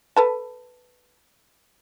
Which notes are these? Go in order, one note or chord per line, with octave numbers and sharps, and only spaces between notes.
A4 B4 A5